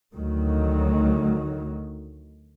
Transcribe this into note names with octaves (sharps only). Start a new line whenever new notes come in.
D2 D#3 F#3